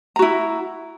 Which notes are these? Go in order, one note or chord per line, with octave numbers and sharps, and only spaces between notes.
E4 F#4 A#5